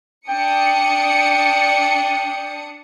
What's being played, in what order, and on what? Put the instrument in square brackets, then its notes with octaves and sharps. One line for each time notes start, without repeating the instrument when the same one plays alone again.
[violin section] D4 D#6 C#7 [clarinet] G5